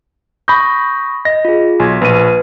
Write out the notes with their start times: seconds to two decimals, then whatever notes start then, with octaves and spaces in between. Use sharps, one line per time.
0.48 B5 C#6 D#6 G6 A#6
1.25 D#5 A#6
1.45 F4 G#4
1.80 B1 G#5 G#6
2.01 A#1 B4 D#7